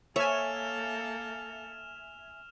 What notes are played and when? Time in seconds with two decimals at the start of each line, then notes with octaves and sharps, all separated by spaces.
0.16 A#3 A4 C#5 E5 G#5 F6 E7 F7